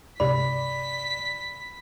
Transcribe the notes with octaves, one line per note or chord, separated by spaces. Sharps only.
C#2 G2 C3 D5 B5 B6